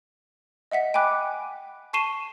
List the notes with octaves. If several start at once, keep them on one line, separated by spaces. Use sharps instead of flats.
D#5 E5 F#5 B6
G5 G#5 B5 D6 F#6
A5 C#6 C7 D#7 E7 G7